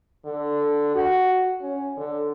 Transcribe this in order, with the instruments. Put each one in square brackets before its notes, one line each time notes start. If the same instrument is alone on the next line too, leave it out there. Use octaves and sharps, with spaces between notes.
[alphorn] D3
F#4
C#4
D3